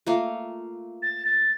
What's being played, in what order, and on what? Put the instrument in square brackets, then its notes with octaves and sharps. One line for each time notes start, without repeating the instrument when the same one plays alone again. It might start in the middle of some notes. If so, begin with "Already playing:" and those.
[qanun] A3 A#3 F4
[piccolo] A6
A6